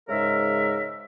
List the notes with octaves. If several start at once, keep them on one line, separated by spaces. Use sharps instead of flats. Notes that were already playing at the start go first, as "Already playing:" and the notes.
G#2 C#3 G#3 A#4 E5